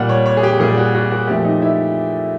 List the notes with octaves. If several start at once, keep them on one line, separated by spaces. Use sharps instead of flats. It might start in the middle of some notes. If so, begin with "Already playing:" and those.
Already playing: A#2 G3 F#5
C#5
C#5
G#4
G4
A#2 G3 G#4
F#4
F#4
F#4
A#2 F3 A3 G4
D#4
E4